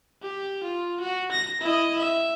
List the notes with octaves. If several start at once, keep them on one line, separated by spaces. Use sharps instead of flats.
G4
F4
F#4
A#6
E4 D#5
E5